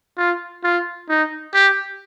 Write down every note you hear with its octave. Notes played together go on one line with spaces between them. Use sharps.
F4
F4
D#4
G4